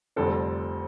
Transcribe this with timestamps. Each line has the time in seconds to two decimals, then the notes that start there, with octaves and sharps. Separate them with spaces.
0.16 F1 F2 D3 G3 C4 A4